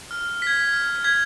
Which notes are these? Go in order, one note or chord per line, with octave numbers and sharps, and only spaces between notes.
F6
G#6 B6
F6
G#6 B6